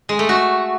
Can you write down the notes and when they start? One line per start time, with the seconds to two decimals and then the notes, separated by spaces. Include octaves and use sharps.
0.09 G#3
0.19 A3
0.29 F#4